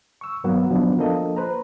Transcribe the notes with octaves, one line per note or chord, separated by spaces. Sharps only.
C#6 E6
G2 D#3 F#3 A#3 B3 F#5
D#3 F3 F#3 B3 C#4 D4
F3 A#3 D4 A4 D#5
B4 C5 A#5